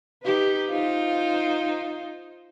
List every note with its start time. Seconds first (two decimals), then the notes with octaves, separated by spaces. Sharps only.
0.24 D#4 G4 B4
0.70 D#4 F4 C5